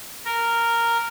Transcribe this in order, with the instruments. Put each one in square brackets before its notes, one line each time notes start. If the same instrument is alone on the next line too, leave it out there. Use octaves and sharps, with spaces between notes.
[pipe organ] A#4